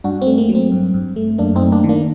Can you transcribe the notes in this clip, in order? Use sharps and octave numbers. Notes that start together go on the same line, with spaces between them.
G2 D4 F#4
C4
A3
A#3
F#3
C4
G2
G2
A3
F#2 A#3 D4
C4 D#4
A3
A#3 D4
D#3
A#3 D4